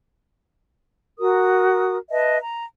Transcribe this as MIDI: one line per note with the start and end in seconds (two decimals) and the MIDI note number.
1.19 1.97 66
1.19 1.97 70
1.19 1.97 87
2.11 2.38 71
2.11 2.38 75
2.11 2.38 76
2.11 2.38 81
2.40 2.64 82